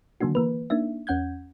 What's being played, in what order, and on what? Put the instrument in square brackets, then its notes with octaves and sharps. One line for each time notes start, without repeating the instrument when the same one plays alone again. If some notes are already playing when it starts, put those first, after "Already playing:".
[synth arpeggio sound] D3 D#3 F#3 A#3 D4 F#4
E3 A#3 B4
A#3 D4 D#4 E5
E2 C#4 F#5 G6 G#6